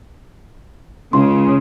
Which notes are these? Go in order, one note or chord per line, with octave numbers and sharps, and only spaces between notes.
C#2 C#3 C6